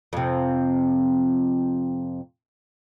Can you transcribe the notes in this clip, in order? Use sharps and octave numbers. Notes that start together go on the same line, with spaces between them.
F2 C3